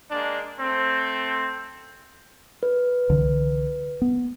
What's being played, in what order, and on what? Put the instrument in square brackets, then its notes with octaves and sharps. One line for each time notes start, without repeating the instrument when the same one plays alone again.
[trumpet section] G#3 A#3 D4
A3 C4
[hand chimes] B4
[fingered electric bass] C2 D3 E3
B3